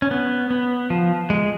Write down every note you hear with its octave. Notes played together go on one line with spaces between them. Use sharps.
C#4
B3
B3
F3
G#3